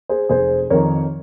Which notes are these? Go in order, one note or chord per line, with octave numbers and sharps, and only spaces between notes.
G#4 C5
F1 G#4 C5
F2 D#3 A#4 C#5